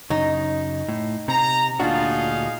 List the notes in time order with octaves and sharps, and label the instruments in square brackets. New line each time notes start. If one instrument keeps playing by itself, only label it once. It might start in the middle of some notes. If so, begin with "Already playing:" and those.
[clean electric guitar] F#2 C#3 [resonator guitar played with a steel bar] D#4
[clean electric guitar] A2
[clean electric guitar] C3 [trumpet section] A#5
[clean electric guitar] D2 A#2 F#4 [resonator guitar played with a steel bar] D4 F4 [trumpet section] D#4 G#4 F5